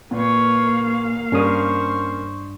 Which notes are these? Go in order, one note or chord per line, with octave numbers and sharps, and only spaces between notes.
A#2 A#3 B4 C#5 F5
G2 C#4 D4 A#4 C5 C#6 D#6